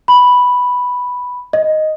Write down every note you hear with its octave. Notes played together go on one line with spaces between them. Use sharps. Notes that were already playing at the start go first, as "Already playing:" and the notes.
B5
D#5